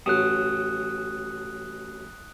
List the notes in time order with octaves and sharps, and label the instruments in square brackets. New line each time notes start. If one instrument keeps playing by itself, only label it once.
[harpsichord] A1 F#3 [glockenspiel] D#6 F#6